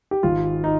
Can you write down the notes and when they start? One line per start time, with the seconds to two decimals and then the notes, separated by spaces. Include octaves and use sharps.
0.11 G4
0.23 G#1 F4
0.64 D#4